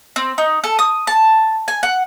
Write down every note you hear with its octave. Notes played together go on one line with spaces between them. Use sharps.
C4
D#4
A4
D#6
A5
G#5
F#5